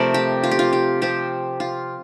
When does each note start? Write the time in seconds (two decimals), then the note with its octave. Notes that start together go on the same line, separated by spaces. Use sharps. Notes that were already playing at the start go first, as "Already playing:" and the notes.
Already playing: C3 F3 A3 A#4 D5
0.14 G4
0.44 F4
0.51 G4
0.59 F4
0.73 G4
1.02 F3 C4 F4 G4
1.60 F4